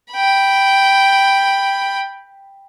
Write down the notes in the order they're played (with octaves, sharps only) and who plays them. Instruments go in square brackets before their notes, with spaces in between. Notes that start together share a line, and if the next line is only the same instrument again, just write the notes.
[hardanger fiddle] G5 B5